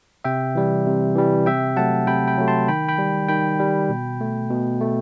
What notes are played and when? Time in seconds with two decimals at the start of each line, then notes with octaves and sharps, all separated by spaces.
0.24 C3 E5 G5
0.55 E3 G3
0.86 C3
1.15 E3 G3
1.46 C3 E5 G5
1.76 F#3 A3 F#5 A5
2.07 C3 G5 B5
2.28 G5 B5
2.38 F#3 A3
2.48 A5 C6
2.68 D#3 G5 B5
2.88 G5 B5
2.98 G3
3.28 D#3 G5 B5
3.59 G3
3.89 B2
4.21 A3
4.50 B2
4.81 A3